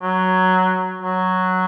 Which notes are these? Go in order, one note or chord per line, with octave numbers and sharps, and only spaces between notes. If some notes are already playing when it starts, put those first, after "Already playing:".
F#3
F#3